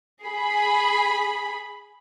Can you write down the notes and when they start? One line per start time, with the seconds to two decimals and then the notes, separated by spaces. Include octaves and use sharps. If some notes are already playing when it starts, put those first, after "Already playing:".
0.25 G#4 B5